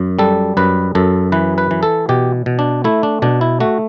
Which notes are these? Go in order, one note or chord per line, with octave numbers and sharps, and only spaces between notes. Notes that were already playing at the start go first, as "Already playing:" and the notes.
Already playing: F#2
G3 A4
F#2 B4
F#2 A4
E3 B4
B4
E3
A4
B2 G4
B2
D4
A3 E4
D4
B2 D4
E4
A3 F#4